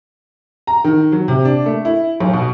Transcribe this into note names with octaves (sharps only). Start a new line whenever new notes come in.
A#5
D#3
F#3
C3
D4
A3
E4
B1
B2